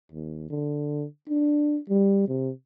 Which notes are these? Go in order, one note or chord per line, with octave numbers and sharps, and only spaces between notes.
D#2
D3
D4
G3
C3